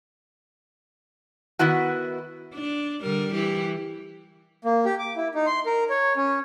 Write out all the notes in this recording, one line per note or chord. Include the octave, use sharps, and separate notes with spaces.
D#3 B3 E4 F#4
D4
D3 G3 A#4
E3 G4
A#3
G4
D6
E4
D#4
C6
A#4
C#5
C#4